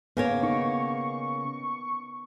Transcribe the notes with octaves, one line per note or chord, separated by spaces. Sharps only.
C#3 A#3 B3 C#5
D#4 C#6